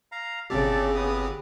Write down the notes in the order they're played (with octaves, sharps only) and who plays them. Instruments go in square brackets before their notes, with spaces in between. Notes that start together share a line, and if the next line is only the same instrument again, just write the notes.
[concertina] F5 A#5
[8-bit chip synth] G1 C4 G4 [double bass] C#3 [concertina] A4 D5
[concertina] B3 D#6